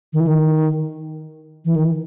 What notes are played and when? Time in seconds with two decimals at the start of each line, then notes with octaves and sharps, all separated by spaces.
0.13 D#3
0.20 E3
0.27 D#3
1.65 E3
1.76 D#3
1.85 E3